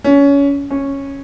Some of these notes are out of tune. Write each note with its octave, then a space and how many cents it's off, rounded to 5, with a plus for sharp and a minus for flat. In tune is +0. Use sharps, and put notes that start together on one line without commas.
C#4 +25
C#4 -5